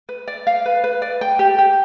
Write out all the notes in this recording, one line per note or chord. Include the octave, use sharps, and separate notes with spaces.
B4
D5
F5
B4
B4
D5
G5
G4
G4